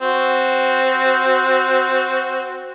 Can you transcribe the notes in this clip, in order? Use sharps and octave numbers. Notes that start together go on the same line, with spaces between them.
C4 F#4